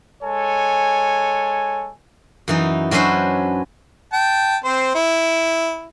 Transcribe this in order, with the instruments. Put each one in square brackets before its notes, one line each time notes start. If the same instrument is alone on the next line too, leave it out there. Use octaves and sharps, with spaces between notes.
[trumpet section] G#3 A4 C#5 G#5
[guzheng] F#2 E3 D#4
F#3 C#4 D4 B4 C5 E5
[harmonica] G5 A5
C4 C5
E4